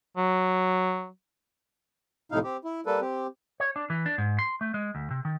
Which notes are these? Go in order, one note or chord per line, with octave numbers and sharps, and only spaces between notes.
F#3
F2 A2 C3 D#4 E4 F5
C4 G4
E4
G3 A#3 A4 B4
C4 G4
C#5
D4
E3
D4
G#2
C6
A3
G#3
D2
C3
D#3